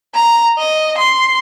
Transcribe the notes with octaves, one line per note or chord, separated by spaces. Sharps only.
A#5
D#5
C6